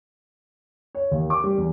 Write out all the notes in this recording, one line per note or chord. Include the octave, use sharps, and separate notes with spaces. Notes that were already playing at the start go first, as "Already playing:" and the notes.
C#5
D#2
D6
G3
E2